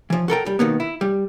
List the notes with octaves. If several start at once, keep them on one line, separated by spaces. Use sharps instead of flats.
E3 F3
F#4 A4 A#4 G5
G3
B2 D#3 A#3 B3
E4
G3